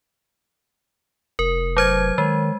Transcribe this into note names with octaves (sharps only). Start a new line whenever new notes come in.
F1 A#4
F#3 C5 G#6
D#3 G#3